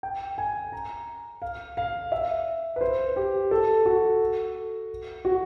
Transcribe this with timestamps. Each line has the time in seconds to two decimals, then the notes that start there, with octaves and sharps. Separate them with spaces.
0.03 G5
0.38 G#5
0.72 A#5
1.42 F5
1.77 F5
2.12 E5
2.76 B4
2.81 C5
3.16 G4
3.51 A4
3.86 F#4
5.25 F#4